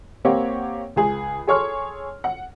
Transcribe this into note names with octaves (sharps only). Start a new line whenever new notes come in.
A#3 C4 G4 C#5 F#5
C#2 G#4
G#4 A4 C#5 C6 C#6 F6
F#5